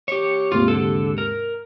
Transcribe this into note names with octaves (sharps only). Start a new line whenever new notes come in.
G4 C#5
D#2 G#2 C3 F4
D3 A4
A#4